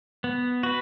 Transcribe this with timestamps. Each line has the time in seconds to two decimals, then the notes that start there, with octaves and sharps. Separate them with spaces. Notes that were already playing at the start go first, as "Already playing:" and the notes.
0.24 B3
0.63 F#4 B4